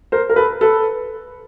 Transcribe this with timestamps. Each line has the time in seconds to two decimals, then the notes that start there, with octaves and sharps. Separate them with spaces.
0.12 A#4 C5
0.30 A#4
0.36 A4 B4
0.61 A4 B4